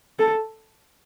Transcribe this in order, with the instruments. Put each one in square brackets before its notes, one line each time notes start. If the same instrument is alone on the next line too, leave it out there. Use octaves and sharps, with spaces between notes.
[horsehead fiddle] A4